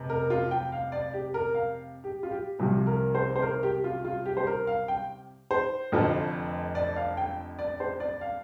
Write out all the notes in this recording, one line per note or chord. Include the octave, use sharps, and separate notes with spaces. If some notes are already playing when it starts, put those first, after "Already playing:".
Already playing: F1 C3
A#4
F4
G5
F5
D5
G4
A#4
F5
G4
F4
G4
C2 C3 F3 G4
A#4
C5
C5
A#4
G4
F4
F4
G4
C5
A#4
F5
G5
C5
F1 F2 D3 F3
D5
F5
G5
D5
C5
D5
F5